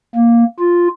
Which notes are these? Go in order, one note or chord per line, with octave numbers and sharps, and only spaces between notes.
A#3
F4